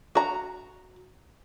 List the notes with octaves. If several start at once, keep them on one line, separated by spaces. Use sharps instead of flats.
F#4 A#5